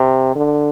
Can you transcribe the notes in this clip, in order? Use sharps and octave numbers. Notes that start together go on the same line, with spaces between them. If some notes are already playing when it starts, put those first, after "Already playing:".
Already playing: C3
D3